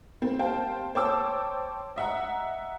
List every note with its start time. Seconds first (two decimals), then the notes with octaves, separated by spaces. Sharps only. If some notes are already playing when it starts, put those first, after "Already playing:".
0.22 A#3 C4
0.39 G4 C5 F5 G5 A5
0.95 C5 C#5 G5 A5 D6 E6
1.96 D#5 E5 F#5 A#5